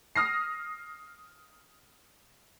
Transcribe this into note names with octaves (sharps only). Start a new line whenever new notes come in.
D#6 F6 A#6 C7